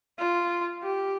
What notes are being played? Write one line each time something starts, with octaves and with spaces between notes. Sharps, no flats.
F4
G4